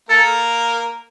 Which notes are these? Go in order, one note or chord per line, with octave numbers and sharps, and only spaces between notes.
A#3 A4 A#4